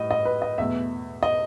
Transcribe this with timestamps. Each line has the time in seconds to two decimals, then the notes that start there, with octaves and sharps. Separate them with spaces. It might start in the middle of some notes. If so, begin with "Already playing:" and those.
Already playing: A2 G3 D#5
0.11 D#5
0.25 B4
0.42 D#5
0.58 E2 B2 A3 E5
1.23 D#5